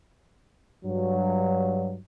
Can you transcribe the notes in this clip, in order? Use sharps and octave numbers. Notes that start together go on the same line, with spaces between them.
G2 F#3